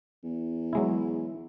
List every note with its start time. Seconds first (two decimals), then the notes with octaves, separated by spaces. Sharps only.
0.24 E2
0.73 F#3 G#3 E4